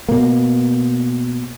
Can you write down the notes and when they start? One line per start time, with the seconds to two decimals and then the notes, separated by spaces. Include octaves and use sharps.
0.09 B2 A#3